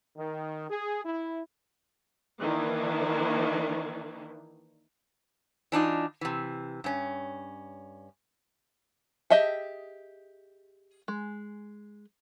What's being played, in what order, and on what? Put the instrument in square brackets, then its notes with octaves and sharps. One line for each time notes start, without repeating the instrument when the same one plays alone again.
[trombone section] D#3
G#4
E4
[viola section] D#3 E3 A#3 D4 E4
[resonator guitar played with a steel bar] E3 D4 D#4 F4
C3 E3
G2 C#4
[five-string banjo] G4 G#4 D#5 E5 A5
G#3